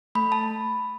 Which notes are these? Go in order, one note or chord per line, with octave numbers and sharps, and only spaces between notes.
A3 B5
A5